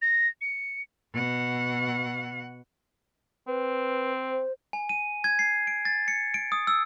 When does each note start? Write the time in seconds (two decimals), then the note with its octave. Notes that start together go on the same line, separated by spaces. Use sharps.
0.02 A#6
0.41 C#7
1.13 B2 F#5
3.47 C4 B4
4.30 C5
4.73 G#5
4.89 D#7
5.24 G#6
5.39 C7
5.67 D7
5.85 A6
6.08 C#7
6.34 D7
6.52 D#6
6.67 E6